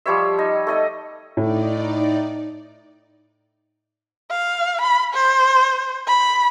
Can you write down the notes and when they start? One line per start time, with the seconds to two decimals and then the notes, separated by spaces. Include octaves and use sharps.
0.06 F3 G3 C#5 E5
0.39 D#4
0.67 A3 D#4 D#5
1.37 A2 D#4 D5
4.31 F5
4.81 B5
5.14 C5
6.08 B5